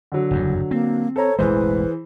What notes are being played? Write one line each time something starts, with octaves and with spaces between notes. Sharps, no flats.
D3 F#3
F#1 E2 G2
A#3 C4
A4 C5 C#5 A#5
E1 A1 E3 G#3 G#4 B4 C5